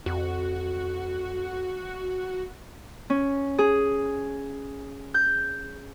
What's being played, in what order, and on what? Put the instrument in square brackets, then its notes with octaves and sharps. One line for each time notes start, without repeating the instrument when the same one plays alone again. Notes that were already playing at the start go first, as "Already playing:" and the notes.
[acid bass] F2 [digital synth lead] F#4
[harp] C#4
G#4
G6